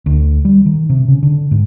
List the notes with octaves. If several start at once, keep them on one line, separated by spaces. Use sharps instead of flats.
D2
G3
D#3
C3
C#3
D3
G#2